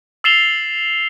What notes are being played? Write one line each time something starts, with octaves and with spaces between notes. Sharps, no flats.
E6 A6 C7 E7 F7 G7